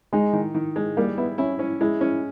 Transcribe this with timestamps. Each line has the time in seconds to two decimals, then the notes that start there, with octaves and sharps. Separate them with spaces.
0.13 G#3 D#4
0.33 D#3
0.54 D#3
0.76 G#3
0.97 G3 A#3
1.17 B3 E4
1.38 C#4 E4
1.59 C#4
1.81 G#3 E4
2.01 C#4